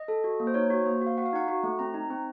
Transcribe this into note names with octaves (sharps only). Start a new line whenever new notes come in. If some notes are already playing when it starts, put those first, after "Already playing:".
Already playing: D#5
A4
F#4
A#3
C5
D#4 C#5
F#4
A#3 C5
F#4
F5
F#4 F#5
F5
D#4 F#5
F#4
A3
C4 A#5
D#4
C4